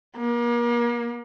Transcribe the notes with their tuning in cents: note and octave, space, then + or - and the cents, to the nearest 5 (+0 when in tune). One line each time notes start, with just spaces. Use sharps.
A#3 +35